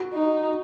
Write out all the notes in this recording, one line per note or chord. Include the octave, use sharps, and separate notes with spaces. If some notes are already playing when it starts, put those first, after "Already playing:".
Already playing: F#4
D#4